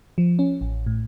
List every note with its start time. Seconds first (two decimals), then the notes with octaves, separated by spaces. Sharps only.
0.18 F3
0.39 C#4
0.61 A1
0.87 A2